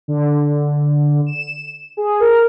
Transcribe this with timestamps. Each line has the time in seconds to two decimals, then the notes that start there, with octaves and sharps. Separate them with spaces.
0.08 D3
1.26 E7
1.97 G#4
2.20 A#4